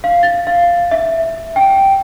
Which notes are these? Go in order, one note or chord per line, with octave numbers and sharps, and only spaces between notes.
F5
A6
F5
E5
G5